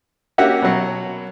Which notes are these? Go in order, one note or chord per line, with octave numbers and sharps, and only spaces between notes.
A#3 C#4 F#4 G4 E5 F#5
B2 F#3